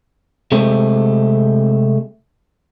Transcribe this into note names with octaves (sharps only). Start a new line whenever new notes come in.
C3 G#3 A3 C4